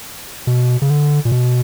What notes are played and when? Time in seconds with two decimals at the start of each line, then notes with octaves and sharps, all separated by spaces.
0.47 B2
0.82 C#3
0.90 D3
1.25 A#2
1.32 B2